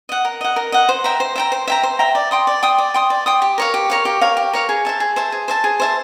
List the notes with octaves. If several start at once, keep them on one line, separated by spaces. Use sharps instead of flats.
D#5 F#5
A#4
D#5 F#5
A#4
D#5 F#5
C5
E5 G5 A#5
C5
E5 G5 A#5
C5
E5 G5 A#5
C5
E5 G5 A#5
D5
G5 C6 D#6
D5
G5 C6 D#6
D5
G5 C6 D#6
D5
G5 C6 D#6
G4
A#4 C#5 F5
G4
A#4 C#5 F5
G4
A#4 C#5 F5
G4
A#4 C#5 F5
G#4
C5 E5 A5
G#4
C5 E5 A5
G#4
C5 E5 A5
G#4
C5 E5 A5